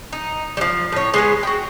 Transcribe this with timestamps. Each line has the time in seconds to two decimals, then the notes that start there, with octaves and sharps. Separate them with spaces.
0.12 D#4
0.57 F3 G3
0.92 A2 C#5
1.14 G#3 B3 G#4
1.43 F#4 G5